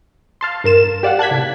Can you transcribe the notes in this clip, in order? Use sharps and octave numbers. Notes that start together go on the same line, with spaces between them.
F5 A5 C6
G2 A#4 E7
G4 D5 F5 F#5
A5 F#6 G#6 B6
A2 C3